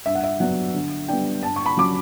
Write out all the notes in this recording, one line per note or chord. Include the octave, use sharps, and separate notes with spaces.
G2 E5
F#5
E5
F#3 B3 D4 F#5
D3
G3 B3 D4 G5
G2 A5
C#6
B5
F#3 C#4 D6